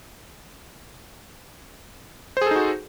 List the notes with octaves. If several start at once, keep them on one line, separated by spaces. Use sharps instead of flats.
D#4 F#4 G#4 A4 C5